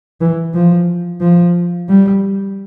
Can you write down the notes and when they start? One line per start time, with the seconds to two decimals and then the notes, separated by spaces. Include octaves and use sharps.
0.21 E3
0.54 F3
1.21 F3
1.88 G3